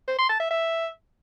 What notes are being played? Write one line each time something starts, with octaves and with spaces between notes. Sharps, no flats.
C5
C6
A5
E5
E5